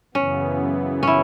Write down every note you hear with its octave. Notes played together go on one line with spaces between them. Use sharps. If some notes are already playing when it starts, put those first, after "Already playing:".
F#2 C#3 E3 B3 C#4
C#4 E4